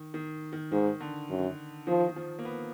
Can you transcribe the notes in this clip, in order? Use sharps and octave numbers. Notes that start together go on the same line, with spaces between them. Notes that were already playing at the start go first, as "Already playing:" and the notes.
Already playing: D#3
D#3
D#3
G#2 D#3
D3
F#2
D#3 F3
D#3
F3
A#3
B3